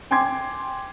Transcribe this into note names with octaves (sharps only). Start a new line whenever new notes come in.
G5 G#5 C6 D6 G#6